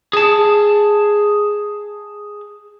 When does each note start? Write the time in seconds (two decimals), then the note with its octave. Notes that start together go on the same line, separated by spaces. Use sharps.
0.13 G#4 A5